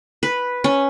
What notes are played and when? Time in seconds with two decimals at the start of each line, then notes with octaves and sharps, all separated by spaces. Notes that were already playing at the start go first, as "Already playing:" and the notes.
0.23 B4
0.64 C#4